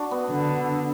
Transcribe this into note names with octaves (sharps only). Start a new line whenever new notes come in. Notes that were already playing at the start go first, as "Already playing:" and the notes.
Already playing: D4 F#4
B3
D3